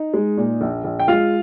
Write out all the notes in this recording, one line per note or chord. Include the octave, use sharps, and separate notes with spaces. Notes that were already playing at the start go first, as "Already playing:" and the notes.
Already playing: D#4
G#3
A#2
A#1
A#1
G5
G#3 F4 F5